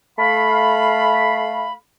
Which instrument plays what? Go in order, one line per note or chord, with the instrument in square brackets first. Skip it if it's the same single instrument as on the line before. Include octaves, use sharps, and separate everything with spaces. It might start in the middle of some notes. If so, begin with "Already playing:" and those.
[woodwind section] A3 F5 B5